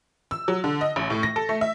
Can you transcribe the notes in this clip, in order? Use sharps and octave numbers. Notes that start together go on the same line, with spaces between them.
E6
F#3
D3
D#5
A1
A2
A#6
A4
A3
E5